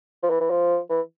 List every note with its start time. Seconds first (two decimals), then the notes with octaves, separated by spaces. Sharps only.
0.23 F3
0.30 E3
0.40 E3
0.50 F3
0.90 E3